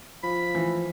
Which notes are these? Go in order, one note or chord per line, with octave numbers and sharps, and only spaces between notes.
F3 B5
E3